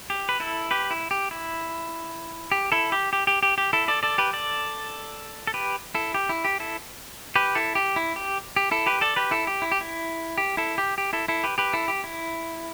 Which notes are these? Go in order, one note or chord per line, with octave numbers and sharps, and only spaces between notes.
G4
B4
E4 A4
G4 B4
E4
G4
E4
G4
E4 A4
G4
G4
G4
G4
G4
E4 A4
A4 D5
A4 D5
G4 B4
A4 D5
A4
G4 B4
E4 A4
G4
E4
G4
E4 A4
G4 B4
E4 A4
G4
E4
G4
G4
E4 A4
G4 B4
A4 D5
G4 B4
E4 A4
G4
E4
G4
E4
G4
E4 A4
G4
G4
E4 A4
E4 A4
G4 B4
G4 B4
E4 A4
G4
E4